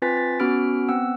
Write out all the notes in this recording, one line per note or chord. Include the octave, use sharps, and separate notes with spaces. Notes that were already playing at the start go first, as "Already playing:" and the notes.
C4 F4 B4 G#5 A6 B6
A6
B3 C#4 F#4 B5 F6 D7
B3 C4 F#5 E6